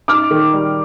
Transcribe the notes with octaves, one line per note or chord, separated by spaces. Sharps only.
D#4 D6 F6
D#3
G3